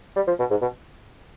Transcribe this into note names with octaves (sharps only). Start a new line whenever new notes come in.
G3
F3
B2
G#2
B2